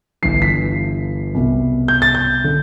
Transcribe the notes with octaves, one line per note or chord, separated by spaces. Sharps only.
G1 G2 E3 C7
B6
C2 B2
G6
A6
G6
D3